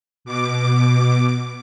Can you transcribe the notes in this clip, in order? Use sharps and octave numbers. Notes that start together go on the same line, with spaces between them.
B2 D6